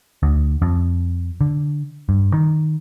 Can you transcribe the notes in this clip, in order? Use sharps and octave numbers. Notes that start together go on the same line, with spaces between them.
D2
F2
D3
G2
D#3